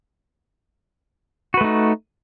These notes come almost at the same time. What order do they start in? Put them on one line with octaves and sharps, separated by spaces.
F#4 B4 A3 D#4